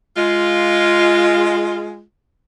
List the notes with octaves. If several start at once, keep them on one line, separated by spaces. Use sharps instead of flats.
G#3 F4